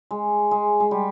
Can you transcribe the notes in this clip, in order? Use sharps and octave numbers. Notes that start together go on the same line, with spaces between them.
G#3
G#3
G#3
G3